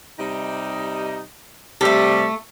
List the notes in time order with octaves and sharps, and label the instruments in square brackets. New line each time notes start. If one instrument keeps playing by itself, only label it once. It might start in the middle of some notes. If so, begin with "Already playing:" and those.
[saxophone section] C3 G3 D#4
[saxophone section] C3 G3 [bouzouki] A3 A4